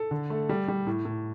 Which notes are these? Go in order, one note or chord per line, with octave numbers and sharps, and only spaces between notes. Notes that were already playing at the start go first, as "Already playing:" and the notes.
Already playing: A4
D3
A3
G3
G3
A2
A2